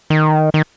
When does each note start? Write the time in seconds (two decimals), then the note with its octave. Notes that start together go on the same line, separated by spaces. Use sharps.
0.10 D#3
0.54 D#3